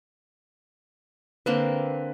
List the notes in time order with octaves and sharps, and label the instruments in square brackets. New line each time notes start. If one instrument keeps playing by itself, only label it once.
[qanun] D3 A#3 C4 [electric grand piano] B4